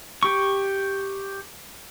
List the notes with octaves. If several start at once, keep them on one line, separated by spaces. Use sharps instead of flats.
G4 C#6